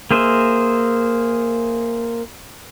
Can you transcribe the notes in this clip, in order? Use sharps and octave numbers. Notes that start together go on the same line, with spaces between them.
A#3 G#4 C5 E5